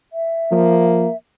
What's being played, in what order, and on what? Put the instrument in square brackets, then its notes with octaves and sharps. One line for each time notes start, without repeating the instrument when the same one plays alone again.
[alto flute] E5
[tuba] F3 [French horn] A#3